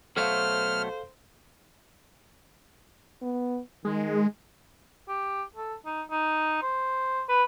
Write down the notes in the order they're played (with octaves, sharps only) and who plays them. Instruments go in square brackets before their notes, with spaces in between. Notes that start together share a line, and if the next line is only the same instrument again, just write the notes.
[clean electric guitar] B2 F#3 A3 [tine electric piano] A4 F5 [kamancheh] C5 [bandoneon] F6
[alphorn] B3
[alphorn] D#3 [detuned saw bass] G#3
[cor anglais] G4
A4
D#4
D#4
C5
B4